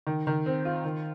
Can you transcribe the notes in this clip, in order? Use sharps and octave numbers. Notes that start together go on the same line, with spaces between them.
D#3
D#3
C4
F4
D#3